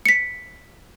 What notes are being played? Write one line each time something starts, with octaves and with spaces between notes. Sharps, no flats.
B6 C#7